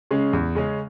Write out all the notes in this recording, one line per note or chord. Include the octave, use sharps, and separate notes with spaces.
C#3 G#3 C#4
E2
C#3 G#3 C#4